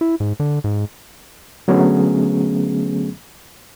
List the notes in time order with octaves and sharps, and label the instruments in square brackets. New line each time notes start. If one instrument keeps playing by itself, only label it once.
[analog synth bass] E4
G#2
D3
G#2
[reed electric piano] D3 F#3 A3 B3 C#4 G#4